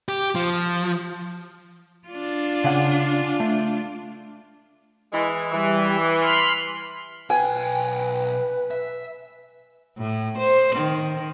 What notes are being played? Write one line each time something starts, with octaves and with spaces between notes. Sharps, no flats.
G4
F3
D4 F4
C#3 F#5 G#5
A3
E3 G#3
E3 G3
B5 C6 F6
B1 B4 G5 G#5
E5
A2
C5
D#3